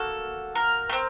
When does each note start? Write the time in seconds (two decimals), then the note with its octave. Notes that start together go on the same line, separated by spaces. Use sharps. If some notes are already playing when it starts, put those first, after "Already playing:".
Already playing: A#3 F#4 A4
0.55 A#4
0.89 A3
0.93 C4